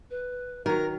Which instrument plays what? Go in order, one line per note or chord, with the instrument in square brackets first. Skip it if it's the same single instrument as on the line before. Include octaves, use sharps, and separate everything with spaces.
[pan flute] B4
[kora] D#3 F#3 [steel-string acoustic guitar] A#4 [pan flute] A#5